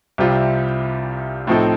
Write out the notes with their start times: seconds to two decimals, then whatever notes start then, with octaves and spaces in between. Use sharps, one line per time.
0.18 C2 C3 G3 C4 F4
1.47 A2 F3 C4 D#4 A4